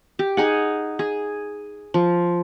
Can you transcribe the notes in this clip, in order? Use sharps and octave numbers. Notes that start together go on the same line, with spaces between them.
G4
D#4 G#4 F#5
G#4
F3